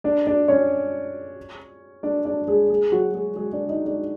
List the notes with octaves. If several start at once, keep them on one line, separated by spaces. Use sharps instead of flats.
D4 D5
D4 D5
C#4 C#5
D4 D5
D4 D5
G#3 G#4
G#3 G#4
F#3 F#4
G#3 G#4
G#3 G#4
D4 D5
D#4 D#5
D4 D5